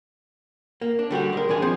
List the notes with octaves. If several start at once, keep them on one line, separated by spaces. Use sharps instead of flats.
A#3
D4
D3 G3 F#4 G4
G#3 A#4
E3 D4 G#4 G#5
F3 C4